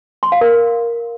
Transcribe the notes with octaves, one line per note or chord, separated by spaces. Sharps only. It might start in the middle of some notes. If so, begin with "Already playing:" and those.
C6
F5
A#4